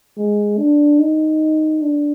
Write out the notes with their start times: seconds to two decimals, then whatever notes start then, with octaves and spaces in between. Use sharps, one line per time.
0.17 G#3
0.58 D4
0.99 D#4
1.82 D4